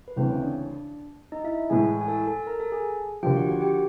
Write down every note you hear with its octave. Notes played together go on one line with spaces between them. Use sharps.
B4
D2 C#3 E3 A3 C4 C5
C#4 C#5
D4 D5
D#4 D#5
E4 E5
A2 E3 G#3 G#4 G#5
G#5
A4 A5
A4 A5
A5
A#4 A#5
A4 A5
G#4 G#5
D#2 D3 F3 G4 G5
F#4 F#5
F#4 F#5
G4 G5